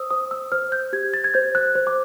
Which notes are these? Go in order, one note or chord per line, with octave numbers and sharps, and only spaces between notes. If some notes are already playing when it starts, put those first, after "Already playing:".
Already playing: C5 D#6 E6
C5 D#6
E6
C5 F6
G6
G4 G#6
A6
G#6
C5 G6
F#6
C5
D6